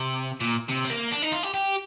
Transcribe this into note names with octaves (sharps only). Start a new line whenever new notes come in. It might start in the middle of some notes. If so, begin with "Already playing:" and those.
Already playing: C3
A#2
C3
C4
A#3
D4
D#4
F4
G4
G4